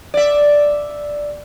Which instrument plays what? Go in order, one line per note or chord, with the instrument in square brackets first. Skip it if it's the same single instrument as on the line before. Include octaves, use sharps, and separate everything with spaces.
[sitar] D5 E5